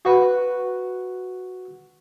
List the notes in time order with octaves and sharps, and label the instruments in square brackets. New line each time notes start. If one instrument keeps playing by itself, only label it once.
[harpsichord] F#4 B4